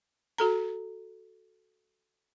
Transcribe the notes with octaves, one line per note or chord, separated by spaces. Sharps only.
F#4 A4 A#5